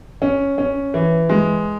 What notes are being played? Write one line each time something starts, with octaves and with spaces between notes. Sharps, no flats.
C#4
C#4
E3
G#3